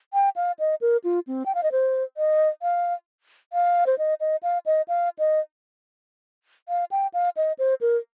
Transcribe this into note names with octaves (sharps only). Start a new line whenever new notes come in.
G5
F5
D#5
A#4
F4
C4
G5
F5
D#5
C5
D#5
F5
F5
C5
D#5
D#5
F5
D#5
F5
D#5
F5
G5
F5
D#5
C5
A#4